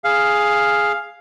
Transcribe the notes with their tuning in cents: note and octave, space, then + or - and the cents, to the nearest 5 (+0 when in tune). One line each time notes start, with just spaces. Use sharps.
G#4 +0 F5 +0